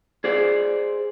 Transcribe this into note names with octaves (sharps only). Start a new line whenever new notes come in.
G#4 C5 D5